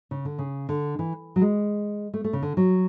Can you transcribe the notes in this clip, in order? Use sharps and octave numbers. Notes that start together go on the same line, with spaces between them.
C#3
D3
C#3
D3
E3
F#3
G#3
A3
A3
C#3
D3
F#3